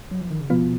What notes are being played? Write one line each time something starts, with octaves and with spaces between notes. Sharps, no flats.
F#3
F3
D#3
C#3
B2 F3 B3 F4